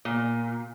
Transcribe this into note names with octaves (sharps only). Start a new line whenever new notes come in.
A#2